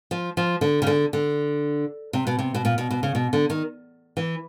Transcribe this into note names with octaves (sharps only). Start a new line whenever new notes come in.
F3
F3
D3
C#3
D3
D3
C3
B2
C3
B2
A#2
B2
B2
C#3
B2
D3
D#3
E3